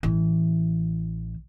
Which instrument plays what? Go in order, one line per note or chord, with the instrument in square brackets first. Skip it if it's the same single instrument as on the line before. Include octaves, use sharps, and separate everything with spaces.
[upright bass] A1 E3